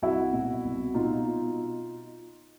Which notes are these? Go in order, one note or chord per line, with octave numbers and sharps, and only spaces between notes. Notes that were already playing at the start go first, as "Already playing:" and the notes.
C2 E4 F#4
B2
C2
B2 D#4 F4